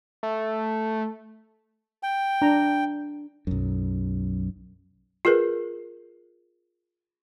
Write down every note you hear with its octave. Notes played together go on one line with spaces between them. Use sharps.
A3
G5
D4 A#5
B1 F#2
F4 G#4 A#4 B4